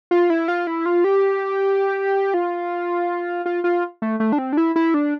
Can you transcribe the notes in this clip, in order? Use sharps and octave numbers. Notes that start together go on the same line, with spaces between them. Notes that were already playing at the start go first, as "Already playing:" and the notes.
F4
E4
F4
E4
F4
G4
F4
F4
F4
A3
A3
D4
C4
D4
E4
E4
D4